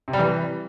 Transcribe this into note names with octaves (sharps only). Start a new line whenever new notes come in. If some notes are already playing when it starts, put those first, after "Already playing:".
C3
G3
E3